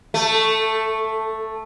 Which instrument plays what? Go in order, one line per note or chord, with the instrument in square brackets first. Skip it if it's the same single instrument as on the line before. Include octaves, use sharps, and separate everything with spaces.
[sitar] A3 [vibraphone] A4 A5